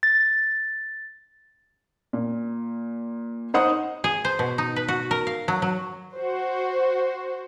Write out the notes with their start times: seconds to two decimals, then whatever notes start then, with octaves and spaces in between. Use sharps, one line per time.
0.03 A6
2.13 A#2
3.54 D#4 C5 F#5 D#6
4.04 G#4
4.25 C5
4.39 B2
4.58 D#4
4.76 B4
4.88 F#4
5.11 A#4
5.27 F5
5.48 F#3
5.62 F#3
6.14 F#4 C5